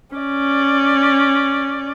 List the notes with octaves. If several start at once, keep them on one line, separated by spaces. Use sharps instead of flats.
C#4 D5